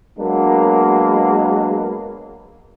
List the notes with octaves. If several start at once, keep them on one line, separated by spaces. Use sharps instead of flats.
F#3 G#3 A#3 B3 D4